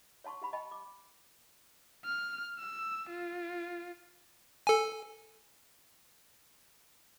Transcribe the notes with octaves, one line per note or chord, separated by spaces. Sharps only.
C#5 F#5 A5 C6 C#6
G4 F#5 B5
D#5 G5 A5 B5
D6
F6
E6
F4
A4 G#5